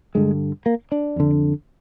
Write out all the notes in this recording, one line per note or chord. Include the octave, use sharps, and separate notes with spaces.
G2 D3 G#3
A#3
D4
F2 D3